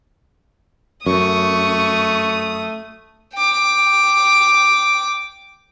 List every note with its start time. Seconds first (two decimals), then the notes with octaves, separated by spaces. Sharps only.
1.06 F#2 A3 C#6 D#6
3.35 G5 D6